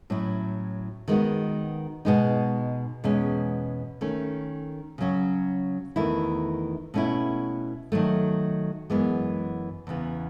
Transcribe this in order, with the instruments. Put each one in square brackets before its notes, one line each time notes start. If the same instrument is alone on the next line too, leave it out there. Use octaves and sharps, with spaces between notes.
[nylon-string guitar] A2 F#3 C#4 E4
D#3 G#3 B3 F#4
B2 G#3 B3 D#4
E2 B2 G#3 C#4
D#3 A3 C#4
C#3 F#3 C#4 F#4
E2 D#3 A3 E4
B2 A3 C#4 E4
D#3 F#3 A3
F#2 E3 G#3 B3
E2 C#3 E3 B3